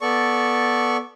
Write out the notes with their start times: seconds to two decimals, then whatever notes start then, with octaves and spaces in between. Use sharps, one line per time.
0.01 B3 A4 D5 C#6